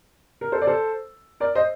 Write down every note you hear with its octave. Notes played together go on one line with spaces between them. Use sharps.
A#4
A4 C5
D5
A4 C5
A#4 D5
C5 D#5